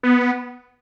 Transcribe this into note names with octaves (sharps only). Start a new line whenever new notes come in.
B3